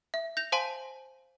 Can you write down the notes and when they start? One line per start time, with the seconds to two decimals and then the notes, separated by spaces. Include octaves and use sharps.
0.14 E5
0.37 G6 A#6 F7
0.52 C5 F5 G#5 A5 C6